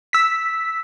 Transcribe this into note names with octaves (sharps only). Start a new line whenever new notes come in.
E6 B6